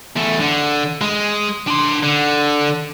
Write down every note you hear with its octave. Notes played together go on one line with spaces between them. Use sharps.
E2 A3
D3
G#3
D4 C6
D3